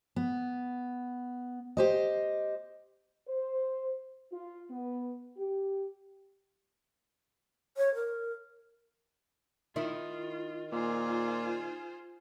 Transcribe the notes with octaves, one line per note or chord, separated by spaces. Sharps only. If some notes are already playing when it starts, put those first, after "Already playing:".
B3
G4 C5 D#5
C5
F4
B3
G4
C#5
A#4
D#3 E4 F4
A#2 F4 G#4 C5